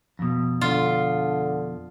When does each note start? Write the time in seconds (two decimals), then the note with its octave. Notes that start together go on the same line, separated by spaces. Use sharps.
0.19 F2 B2
0.61 D3 F4